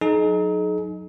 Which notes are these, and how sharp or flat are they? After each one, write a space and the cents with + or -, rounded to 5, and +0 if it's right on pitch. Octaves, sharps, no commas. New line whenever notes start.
F#3 -20 D#4 +0 G#4 +45